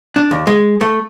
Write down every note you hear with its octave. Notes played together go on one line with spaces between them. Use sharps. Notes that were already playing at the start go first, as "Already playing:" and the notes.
D4
D#2
G#3
A3